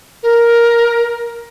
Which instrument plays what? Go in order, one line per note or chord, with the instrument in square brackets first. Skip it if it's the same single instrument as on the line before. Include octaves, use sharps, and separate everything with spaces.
[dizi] A#4